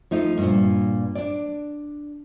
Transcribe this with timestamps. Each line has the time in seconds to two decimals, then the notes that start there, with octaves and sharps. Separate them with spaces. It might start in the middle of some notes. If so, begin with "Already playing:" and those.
0.11 F3 A3 D#4
0.38 G2 A#2
1.15 D4 D5